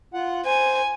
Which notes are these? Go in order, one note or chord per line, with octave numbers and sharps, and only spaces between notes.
F4 F#5
C5 G#5